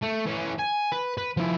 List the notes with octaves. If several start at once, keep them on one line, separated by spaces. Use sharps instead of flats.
A3
E3 C#4
G#5
B4
B4
F3 E4